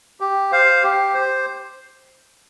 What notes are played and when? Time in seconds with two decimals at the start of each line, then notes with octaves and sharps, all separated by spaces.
0.21 G4
0.52 C5 F5
0.83 G4
1.14 C5